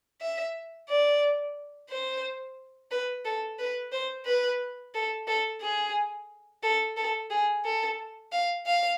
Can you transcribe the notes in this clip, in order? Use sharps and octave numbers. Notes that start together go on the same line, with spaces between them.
E5
D5
C5
B4
A4
B4
C5
B4
A4
A4
G#4
A4
A4
G#4
A4
F5
F5